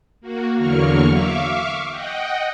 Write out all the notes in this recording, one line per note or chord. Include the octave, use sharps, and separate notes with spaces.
A#3 F#4
E2 D3 F#3 A#3 C#6 F6
E5 F5 C#6 D6
D#5 F#5 G5